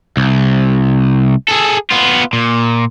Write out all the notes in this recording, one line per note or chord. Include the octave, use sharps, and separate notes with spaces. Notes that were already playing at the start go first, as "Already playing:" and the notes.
C2
G#4 A4
B3 F4
A#2